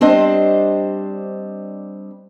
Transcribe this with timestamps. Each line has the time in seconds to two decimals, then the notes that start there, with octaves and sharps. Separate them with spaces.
0.01 G3 C4 D4 C5 D#5